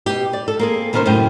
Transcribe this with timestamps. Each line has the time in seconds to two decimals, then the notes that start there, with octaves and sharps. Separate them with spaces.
0.06 B2 G4
0.33 D5
0.48 A4
0.59 A#3 C4 G#4
0.93 B2 D#3 C#4 A#4 C5
1.06 F#2 A2 C3 G5